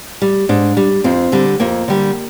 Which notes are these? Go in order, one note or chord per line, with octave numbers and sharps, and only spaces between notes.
G3
G#2 D4
G3
F2 C4
D3 G3
F2 A#3
D3 G3